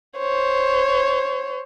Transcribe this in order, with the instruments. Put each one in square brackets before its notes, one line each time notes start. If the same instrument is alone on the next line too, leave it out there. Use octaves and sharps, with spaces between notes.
[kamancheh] C5 C#5